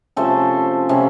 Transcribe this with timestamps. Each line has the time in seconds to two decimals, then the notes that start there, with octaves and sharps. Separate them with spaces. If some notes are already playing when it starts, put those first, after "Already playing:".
0.16 C3 F3 A3 C#4 A4 C5
0.89 C3 F3 A#3 C#4